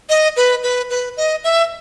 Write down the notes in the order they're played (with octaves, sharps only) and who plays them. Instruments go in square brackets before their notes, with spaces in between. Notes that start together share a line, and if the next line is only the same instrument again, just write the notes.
[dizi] D#5
B4
B4
B4
D#5
E5